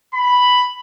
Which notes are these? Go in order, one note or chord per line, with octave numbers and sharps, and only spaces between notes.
B5